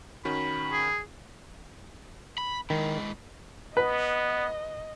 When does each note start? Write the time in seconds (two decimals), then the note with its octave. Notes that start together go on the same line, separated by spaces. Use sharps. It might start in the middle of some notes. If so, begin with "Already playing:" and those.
0.25 D#3 C#4 F#4 B5
0.72 G#4
2.38 B5
2.70 D#3 G#3 E4
3.77 B3 B4 D#5